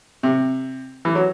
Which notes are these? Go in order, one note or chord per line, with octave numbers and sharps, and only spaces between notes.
C3
E3
F#3